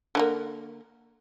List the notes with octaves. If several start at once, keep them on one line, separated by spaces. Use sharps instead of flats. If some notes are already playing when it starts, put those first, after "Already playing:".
D3 F#3 A#3